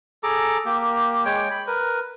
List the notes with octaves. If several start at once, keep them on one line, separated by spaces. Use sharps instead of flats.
G#4 A4 A#5 D6
A#3 G4
G#3 C#5 G5
B5
A#4 B4